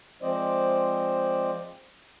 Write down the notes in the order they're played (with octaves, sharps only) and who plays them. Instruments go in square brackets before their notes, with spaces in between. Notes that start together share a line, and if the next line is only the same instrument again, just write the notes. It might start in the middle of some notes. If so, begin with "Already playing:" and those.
[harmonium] F3 G#3 C4 C5 D5 D#5